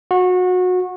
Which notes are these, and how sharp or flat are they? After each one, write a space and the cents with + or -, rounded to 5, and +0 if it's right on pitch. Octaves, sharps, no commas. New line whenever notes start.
F#4 -25